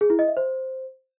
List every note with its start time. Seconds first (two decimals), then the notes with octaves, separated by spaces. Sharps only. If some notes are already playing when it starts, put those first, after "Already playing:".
0.01 G#4
0.10 E4
0.19 D#5
0.28 E5
0.37 C5